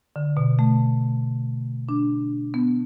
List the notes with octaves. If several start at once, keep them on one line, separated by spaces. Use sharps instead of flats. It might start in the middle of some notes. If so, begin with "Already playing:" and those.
D3
B2
A3
D4
B3